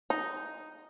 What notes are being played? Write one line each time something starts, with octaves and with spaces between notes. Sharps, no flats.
D#4